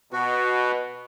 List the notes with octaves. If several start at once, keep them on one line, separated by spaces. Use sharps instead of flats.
B2 F#4